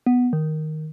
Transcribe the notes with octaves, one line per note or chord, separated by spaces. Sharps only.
B3
D#3